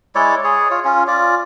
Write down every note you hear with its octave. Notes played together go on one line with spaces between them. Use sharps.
G#3 E4 C#5 D5
G#4 C#5
F4 C#5
C#4 F4
F4 D5